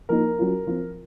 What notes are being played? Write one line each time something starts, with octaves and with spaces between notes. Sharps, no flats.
F3 A#3 D#4 A#4
F#3 C#4 F4
F3 C4 F4